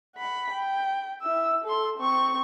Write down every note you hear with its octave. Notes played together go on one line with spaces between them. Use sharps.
F#5 B5
G5
E4 E6
A4 C6
C4 C#6